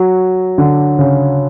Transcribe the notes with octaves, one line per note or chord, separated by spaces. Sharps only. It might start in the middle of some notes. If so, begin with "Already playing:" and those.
Already playing: F#3
D3
C#3